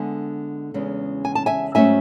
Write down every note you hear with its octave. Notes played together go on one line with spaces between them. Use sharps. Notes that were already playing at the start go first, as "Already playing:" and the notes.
Already playing: D3 G#3 B3 D4 E5 G#5
E2 C#3 G#3 C#4
G#5
A5
E5 G#5
G#2 F#3 A3 C#4 E5 G#5